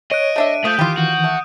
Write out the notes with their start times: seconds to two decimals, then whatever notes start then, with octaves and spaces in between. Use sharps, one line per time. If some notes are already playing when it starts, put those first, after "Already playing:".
0.12 C#5 D#5 F#6 D7 D#7
0.36 A3 D4 E5
0.65 F3 A3 D#6 G6 D#7
0.79 D#3 E3 G3 F4 G4
0.98 F#4
1.24 A3